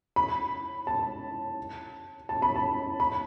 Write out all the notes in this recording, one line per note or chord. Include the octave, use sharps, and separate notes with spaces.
B5
A5
A5
B5
A5
B5